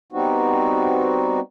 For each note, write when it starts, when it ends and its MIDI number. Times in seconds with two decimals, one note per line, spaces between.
0.12 1.40 55
0.12 1.40 59
0.12 1.40 60
0.12 1.40 63
0.12 1.40 66